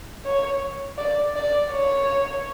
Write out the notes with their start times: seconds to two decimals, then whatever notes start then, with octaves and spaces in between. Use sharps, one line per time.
0.25 C#5
0.98 D5
1.36 D5
1.72 C#5